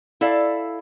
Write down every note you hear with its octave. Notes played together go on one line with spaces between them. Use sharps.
E4 A4 D5 F5